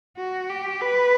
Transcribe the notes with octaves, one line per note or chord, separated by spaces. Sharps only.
F#4
G4
B4